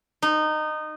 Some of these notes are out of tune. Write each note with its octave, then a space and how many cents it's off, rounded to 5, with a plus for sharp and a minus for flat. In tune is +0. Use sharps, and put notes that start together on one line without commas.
D#4 -20